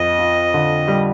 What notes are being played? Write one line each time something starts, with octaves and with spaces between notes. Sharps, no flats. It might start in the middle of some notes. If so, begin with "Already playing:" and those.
Already playing: F2 D#5
F4
D3
G3